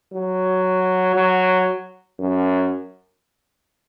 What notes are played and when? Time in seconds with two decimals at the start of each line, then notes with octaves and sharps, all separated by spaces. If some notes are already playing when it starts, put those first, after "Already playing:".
0.13 F#3
1.16 F#3
2.19 F#2